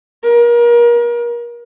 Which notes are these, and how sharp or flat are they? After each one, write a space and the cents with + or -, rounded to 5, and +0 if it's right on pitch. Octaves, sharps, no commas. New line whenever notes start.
A#4 +35